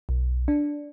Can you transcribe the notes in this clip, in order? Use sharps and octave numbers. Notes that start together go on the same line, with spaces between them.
B1
D4